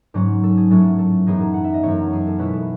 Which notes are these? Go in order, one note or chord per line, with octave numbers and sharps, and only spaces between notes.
G#2 F#3 C#4
A4
G#4
A2 F#3 A3 C#4 A4
A4
F#2 E3 B3 D#4 G#4
A4
F#5
E5
D#5
F#2 E3 A3 D#4 C#5
G#4
A4
B2 G#3 C#4 E4 B4
A4